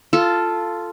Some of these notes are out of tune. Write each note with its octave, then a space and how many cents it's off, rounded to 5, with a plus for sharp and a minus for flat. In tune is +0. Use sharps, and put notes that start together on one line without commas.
F4 -10 A4 +0